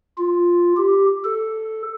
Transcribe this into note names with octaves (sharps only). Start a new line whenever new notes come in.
F4
G4
A4